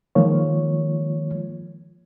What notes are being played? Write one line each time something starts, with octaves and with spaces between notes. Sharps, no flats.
D#3 F3 G#3 A#3 F4 C#5